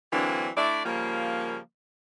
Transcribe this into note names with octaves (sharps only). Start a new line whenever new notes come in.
D3 E3 F#3 A#3 C4 D4
A3 D4 E4 D5
C#3 F3 G3 A#3